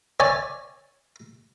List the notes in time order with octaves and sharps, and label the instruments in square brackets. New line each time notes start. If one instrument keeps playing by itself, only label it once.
[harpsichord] C#5 D5 G#5